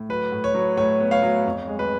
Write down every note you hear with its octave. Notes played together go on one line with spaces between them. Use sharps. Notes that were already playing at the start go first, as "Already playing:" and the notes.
Already playing: A2
F#3 B4
A2
C#5
F#3
A2 C#5
B3
C#5 F5
F#3
F2
G#3
B4